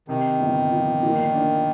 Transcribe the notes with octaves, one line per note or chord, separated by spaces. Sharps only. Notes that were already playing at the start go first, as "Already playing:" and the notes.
C3 D#3
G1
F3
A#2
D4